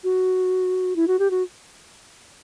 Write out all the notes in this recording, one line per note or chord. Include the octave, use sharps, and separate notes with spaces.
F#4
E4
F#4
G4
F#4